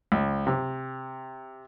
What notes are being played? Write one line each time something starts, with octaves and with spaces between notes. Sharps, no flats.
C#2
C3